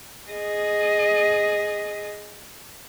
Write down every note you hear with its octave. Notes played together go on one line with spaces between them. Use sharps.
G#4 D#5